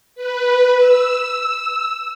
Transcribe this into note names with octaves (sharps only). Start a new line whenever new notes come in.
B4
E6